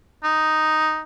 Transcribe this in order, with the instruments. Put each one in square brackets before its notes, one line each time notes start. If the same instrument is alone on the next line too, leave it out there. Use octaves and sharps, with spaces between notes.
[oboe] D#4